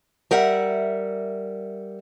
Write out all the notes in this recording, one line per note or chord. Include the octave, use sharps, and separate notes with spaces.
G3 A#4 E5 F#5